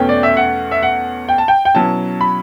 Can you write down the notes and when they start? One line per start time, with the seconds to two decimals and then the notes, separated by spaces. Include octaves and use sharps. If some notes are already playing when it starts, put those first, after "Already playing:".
Already playing: E2 B2 A3 C#4 G5
0.09 D5
0.23 E5
0.37 F#5
0.71 E5
0.83 F#5
1.29 G5
1.38 A5
1.48 G5
1.65 G5
1.75 B2 F#3 C#4 E4 A5
2.21 B5